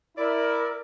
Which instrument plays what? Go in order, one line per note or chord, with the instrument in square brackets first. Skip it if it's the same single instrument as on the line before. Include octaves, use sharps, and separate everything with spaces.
[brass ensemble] E4 [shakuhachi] A#4 [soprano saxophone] D5